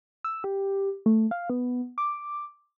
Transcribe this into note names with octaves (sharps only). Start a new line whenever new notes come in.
E6
G4
A3
F5
B3
D6